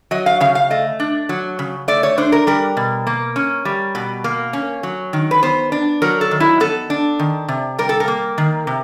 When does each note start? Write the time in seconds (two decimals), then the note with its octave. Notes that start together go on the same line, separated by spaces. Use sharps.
0.11 F#3 D#5
0.26 F5
0.40 C#3 F5
0.55 F5
0.70 A3 D#5
1.00 D4
1.29 F#3
1.59 C#3
1.88 A3 D5
2.03 C#5
2.18 D4 C5
2.32 A#4
2.47 G3 A#4
2.77 B2
3.07 A#3
3.36 C#4
3.65 G3
3.95 B2
4.24 A#3
4.53 C#4
4.83 F#3
5.13 D#3
5.31 B4
5.43 B3 C5
5.72 D4
6.02 F#3 A#4
6.21 A4
6.31 D#3
6.40 E4
6.60 B3 A4
6.90 D4
7.19 D#3
7.48 C3
7.78 G3 A#4
7.89 A4
8.00 A#4
8.08 A#3
8.38 D#3
8.67 C3